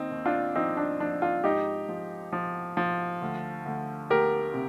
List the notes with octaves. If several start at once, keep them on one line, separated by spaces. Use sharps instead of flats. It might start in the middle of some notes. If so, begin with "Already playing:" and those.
Already playing: D#2 C4 D#4
D#2
D4 F4
F3 C4 D#4
D4
F3 D4
D4 F4
G#2 D#4 G4
F3
F3
F3
D2
D2
D2 G4 A#4
C3